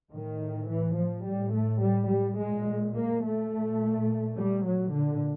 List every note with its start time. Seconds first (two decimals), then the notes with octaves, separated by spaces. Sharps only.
0.12 A2 D#3
0.69 E3
0.97 F3
1.26 A2 G3
1.54 A3
1.82 G3
2.10 G3
2.39 A#2 G#3
2.96 A#3
3.24 A3
3.52 A#2
4.37 G3
4.65 A#2 F#3
4.93 D3